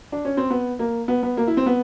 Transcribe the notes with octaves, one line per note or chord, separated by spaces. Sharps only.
D4
C#4
C4
B3
A#3
B3
B3
A#3
E4
C4
B3